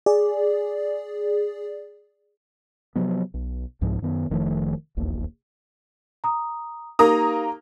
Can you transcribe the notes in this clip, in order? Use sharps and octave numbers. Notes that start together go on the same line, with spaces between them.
G#4 D5
C3 F3 F#3 B3
B1
C2 G#2 F3
F#2 D#3 B3
F1 D#3 F3 A3
E1 A#1 D#2 A#3
A#5 D#6
A#3 D#4 G4 A#4 A#5 D#6